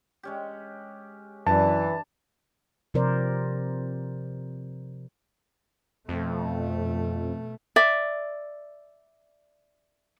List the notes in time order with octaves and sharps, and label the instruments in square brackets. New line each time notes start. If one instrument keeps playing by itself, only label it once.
[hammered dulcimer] G#3 C#4 G4
[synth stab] F#2 [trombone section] E3 B4 [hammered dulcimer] D4 [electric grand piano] A5
[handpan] C3 F3 C4 A#4 C5 D5
[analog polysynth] F2 [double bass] B2 A3
[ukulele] D5 E5